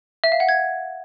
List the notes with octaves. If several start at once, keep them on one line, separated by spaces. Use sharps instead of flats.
E5
F5
F#5
G#6